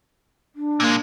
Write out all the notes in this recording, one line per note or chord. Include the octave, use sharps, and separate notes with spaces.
D4
A#2 G#3 A#3